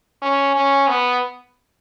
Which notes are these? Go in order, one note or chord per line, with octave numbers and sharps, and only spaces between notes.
C#4
C#4
B3